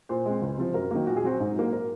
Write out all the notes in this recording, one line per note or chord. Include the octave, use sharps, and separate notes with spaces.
A#2 C5
G#3 C4
C#2
C3 F3
F#2 A#4
D#3 F#3 A#3
A#2 F#4
G#4
F#3 C4 F#4
G#2 D#4
F#3 A#3
A#4